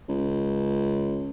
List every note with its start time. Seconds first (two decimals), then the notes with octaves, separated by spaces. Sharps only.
0.09 C#2